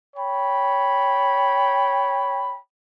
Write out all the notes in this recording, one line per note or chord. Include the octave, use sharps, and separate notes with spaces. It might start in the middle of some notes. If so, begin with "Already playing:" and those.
C#5 G5 B5